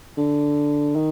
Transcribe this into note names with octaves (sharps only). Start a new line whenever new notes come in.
D3
D#3